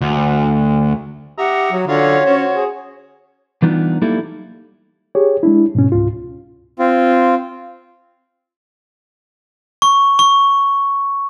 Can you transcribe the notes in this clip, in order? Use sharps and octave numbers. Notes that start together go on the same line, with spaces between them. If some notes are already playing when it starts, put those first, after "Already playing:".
D2
G4 E5 F#5 A#5 D#6
F#3
D3 C#4 F4 F#4 C#5
C#4 F#4 C5
G#4
E3 G3 B3 D4 D#4 F4
F#3 G3 A#3 D#4 E4 A4
G4 G#4 C#5
G#3 D4 E4
G#2 B2 C#4
C#2 G#2 F4
C4 F4
C#6
C#6